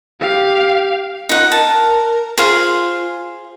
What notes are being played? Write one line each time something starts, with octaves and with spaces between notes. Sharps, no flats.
G4 F5
D#4 F4 F#5
A#4 A5
F4 G#4 C5 F5